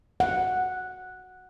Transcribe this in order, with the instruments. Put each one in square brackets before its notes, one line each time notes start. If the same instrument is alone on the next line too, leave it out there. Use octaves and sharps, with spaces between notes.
[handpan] F#5